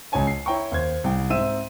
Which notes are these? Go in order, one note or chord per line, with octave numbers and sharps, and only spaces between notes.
C#2 C#3 C#5 G#5 A5
C7
E4 C#5 G5 A#5 C#6
D#2 C5 G#6
C2 G5
G#2 C4 E5 E6 D#7